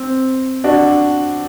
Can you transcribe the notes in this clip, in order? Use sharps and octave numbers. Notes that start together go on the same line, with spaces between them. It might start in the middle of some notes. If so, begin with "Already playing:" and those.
Already playing: C4
D4 F#4